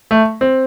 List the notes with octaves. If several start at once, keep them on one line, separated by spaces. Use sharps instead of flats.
A3
C4